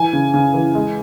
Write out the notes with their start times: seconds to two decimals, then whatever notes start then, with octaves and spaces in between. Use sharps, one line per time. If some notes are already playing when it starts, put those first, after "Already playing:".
Already playing: E3 G#5
0.13 C#3
0.34 C#3
0.54 E3
0.75 G#3